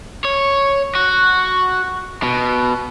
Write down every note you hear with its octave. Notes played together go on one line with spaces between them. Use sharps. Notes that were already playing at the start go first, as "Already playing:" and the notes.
C#5
F#4
B2